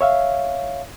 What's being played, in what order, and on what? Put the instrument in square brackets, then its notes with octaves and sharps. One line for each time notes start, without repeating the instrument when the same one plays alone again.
[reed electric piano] C#5 E5 F5